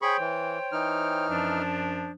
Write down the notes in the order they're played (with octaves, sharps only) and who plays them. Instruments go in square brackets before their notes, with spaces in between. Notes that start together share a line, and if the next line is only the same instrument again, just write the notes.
[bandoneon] G#4 B5 C#6 [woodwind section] C5 C#5 G5
[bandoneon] E3
E3 D#4 F6
[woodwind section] F#2 F3 D4